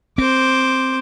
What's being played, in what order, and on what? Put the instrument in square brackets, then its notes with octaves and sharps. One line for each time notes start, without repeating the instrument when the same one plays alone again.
[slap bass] C4 [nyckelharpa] C5 D6